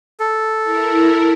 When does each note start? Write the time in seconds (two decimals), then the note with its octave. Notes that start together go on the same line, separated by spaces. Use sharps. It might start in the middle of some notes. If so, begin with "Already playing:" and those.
0.20 A4
0.64 E4 A#4